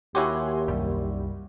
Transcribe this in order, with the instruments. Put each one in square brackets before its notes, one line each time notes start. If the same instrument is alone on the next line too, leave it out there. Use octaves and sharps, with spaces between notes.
[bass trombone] D#2 [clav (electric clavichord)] E4 F#4 G4 [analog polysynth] C#5 G#5 C6
[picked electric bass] C2 F#2 [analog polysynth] G3